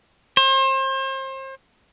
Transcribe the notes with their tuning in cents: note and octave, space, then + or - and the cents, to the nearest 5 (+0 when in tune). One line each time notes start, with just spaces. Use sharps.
C5 +35